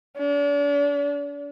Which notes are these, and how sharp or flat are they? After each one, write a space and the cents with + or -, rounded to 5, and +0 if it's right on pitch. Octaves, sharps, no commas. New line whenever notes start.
D4 -40